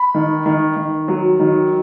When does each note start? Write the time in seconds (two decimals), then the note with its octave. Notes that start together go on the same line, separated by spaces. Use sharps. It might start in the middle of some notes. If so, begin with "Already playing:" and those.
Already playing: B5
0.14 D#3
0.46 D#3
0.76 D#3
1.08 F#3
1.39 D#3